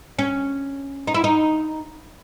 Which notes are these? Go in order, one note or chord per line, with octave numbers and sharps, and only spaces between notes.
C#4
D#4
E4
D#4